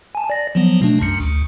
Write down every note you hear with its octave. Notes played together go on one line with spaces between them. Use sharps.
G#5 A5
D5 A#6
F3 F#3 B3
B2 A3 D4
B1 F#2 C#7
D2